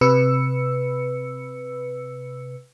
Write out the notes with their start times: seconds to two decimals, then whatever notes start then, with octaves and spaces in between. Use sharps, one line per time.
0.01 C3 B4 E6 C#7